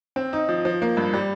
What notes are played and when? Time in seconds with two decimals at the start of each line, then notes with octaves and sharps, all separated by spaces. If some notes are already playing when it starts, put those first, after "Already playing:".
0.16 C4
0.33 D#4
0.49 F3
0.65 F3
0.82 A#3
0.97 G2
1.14 G3